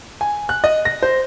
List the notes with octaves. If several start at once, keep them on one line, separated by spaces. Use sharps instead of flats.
G#5
F#6
D#5
A#6
C5